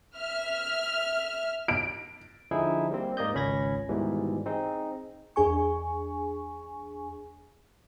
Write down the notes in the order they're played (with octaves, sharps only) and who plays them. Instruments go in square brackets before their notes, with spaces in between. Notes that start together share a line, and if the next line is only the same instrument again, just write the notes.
[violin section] E5 F6
[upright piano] D7
[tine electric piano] D3 F3 D#4 E4 G#4
G3 A#3 C4
G#2 A#3 D5 D#5 G6
G#1 C#2 C#4 B5 G#6 A#6
G#2 B2 D#3 E3 G3
C4 D#4 G#4
[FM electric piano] E2 D4 G#4 G#5 C#6